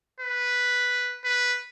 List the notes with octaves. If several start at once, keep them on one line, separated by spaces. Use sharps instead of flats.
B4
B4